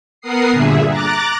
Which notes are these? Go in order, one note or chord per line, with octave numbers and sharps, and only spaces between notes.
B3 A#4 F#5 D#6 C7
G2 A#2 D3 G#4 E5
A#5 D6 F#6 A6